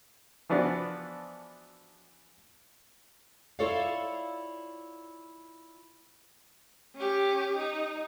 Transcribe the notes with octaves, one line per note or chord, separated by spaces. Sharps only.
E3 F3 B3 D4 F#4
E4 F4 A4 C#5 D5 F5
C#4 G4
D#4